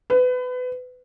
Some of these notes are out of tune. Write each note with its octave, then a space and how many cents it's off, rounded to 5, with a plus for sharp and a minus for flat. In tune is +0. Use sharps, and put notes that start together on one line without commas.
B4 +25